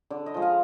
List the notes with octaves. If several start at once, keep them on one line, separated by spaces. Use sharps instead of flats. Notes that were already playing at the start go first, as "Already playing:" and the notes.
D3 D5
D#5
F3 G#3
F5